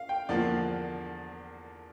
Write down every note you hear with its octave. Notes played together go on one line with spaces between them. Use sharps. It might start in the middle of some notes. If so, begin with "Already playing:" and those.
Already playing: F5
G5
E2 D3 F3 A#3 D4 D5